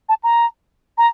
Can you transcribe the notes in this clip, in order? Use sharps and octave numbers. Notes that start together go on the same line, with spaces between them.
A5
A#5
A#5